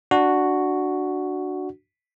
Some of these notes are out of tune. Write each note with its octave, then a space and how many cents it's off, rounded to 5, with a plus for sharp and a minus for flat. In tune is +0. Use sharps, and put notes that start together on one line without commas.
D4 +5 F#4 +0